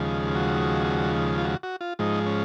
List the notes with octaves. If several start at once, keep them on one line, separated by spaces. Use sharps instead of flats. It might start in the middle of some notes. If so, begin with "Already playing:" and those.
Already playing: D#2 C#3 F3 G#3
F#4
F4
F#4
F#4
F4
G#2 F3 G#3 D#4
C#4